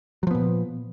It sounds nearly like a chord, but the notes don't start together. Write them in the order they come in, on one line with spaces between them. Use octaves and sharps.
F#3 F3 B3 A#2